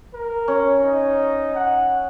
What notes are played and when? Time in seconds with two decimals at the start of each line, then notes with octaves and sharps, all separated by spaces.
0.14 A#4
0.48 C#4
0.84 D#4
1.55 F#5